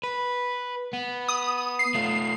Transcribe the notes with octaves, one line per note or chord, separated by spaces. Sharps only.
B4
B3
D#6
C7
A3 F4